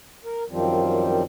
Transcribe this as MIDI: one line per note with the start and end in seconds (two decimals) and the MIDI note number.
0.25 0.43 70
0.50 1.23 42
0.50 1.23 51
0.50 1.23 53
0.50 1.23 55
0.50 1.23 60